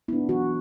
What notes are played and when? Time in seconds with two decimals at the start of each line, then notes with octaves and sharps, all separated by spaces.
0.08 B3 D4 E4
0.29 E3 F#4